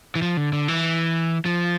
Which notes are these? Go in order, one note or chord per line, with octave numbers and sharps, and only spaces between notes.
E3
F3
D3
D3
E3
F3